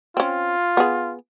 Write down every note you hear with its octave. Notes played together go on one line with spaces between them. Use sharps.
C4 C#4 F4
B3 G#4